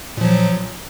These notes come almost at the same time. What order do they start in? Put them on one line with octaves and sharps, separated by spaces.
A#2 F3 F#3